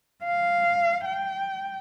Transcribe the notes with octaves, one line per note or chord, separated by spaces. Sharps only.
F5
G5